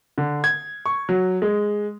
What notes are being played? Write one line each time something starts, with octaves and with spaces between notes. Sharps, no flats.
D3
G#6
C#6
F#3
G#3